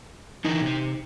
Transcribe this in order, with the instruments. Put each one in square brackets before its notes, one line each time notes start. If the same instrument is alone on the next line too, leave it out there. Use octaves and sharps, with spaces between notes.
[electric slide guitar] D3 E3 A#4 [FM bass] D#4
[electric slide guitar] C3 C4